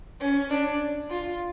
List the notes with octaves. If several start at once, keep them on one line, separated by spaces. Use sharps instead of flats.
C#4
D4
F4